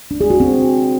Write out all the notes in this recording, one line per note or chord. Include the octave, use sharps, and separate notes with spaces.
D4
G#4
F#4
C4